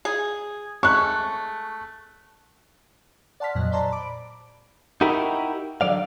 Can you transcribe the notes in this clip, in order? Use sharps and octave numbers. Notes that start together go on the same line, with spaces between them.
G#4
G#3 A3 C#6 F#6
D5 F#5 A5 C6 F6 B6
F2 A#2 F#3 D#5 F#6
C5 D5 A5 A#5 C6 E6
B5 D6 D7
D#4 E4 F#4 G4 A#4
D3 F#3 D5 F5